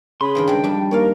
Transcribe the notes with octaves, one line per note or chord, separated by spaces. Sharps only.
C#3 G#4 B5 C6
G2 D#3 A#3
G3 G#3 G5
F2 G3 D4
D#2 A#4 C#5 D5 F5